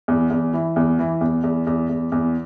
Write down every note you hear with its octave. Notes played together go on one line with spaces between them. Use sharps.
E2
E2
E3
E2
E3
E2
E2
E2
E2
E2